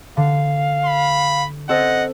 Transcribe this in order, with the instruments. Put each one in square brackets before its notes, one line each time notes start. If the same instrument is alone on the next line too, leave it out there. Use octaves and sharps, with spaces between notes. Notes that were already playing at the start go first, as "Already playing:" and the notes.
[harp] D3 [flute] F5
[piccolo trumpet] B5
[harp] C4 A4 C5 [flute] D#5 [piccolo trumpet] F#5